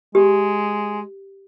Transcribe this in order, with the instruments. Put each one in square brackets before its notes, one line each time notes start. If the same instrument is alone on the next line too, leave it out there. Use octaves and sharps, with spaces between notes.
[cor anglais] G#3 [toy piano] G4